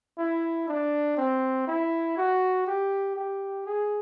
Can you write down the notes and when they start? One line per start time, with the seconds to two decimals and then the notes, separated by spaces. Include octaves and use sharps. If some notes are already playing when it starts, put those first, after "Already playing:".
0.18 E4
0.68 D4
1.17 C4
1.67 E4
2.18 F#4
2.67 G4
3.16 G4
3.66 G#4